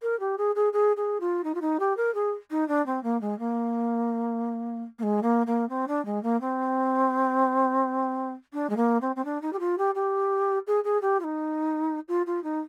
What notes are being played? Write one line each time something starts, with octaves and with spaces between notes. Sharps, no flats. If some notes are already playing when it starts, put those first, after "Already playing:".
A#4
G4
G#4
G#4
G#4
G#4
F4
D#4
F4
D#4
G4
A#4
G#4
D#4
D4
C4
A#3
G#3
A#3
A#3
G#3
A#3
A#3
C4
D4
G#3
A#3
C4
D4
G#3
A#3
C4
C4
D4
D#4
G4
F4
G4
G4
G#4
G#4
G4
F4
D#4
F4
F4
D#4